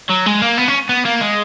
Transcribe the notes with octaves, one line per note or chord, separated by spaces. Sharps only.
F#3
G#3
A#3
B3
C#4
B3
A#3
G#3